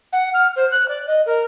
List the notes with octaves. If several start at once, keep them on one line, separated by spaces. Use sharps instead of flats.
F#5
F6
C5
F#6
D5
D#5
A#4